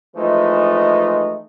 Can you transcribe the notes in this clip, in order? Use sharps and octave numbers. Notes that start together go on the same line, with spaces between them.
E3 F3 G#3 A3 D#4